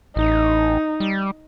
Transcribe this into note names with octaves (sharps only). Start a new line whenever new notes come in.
A1 D#4
G3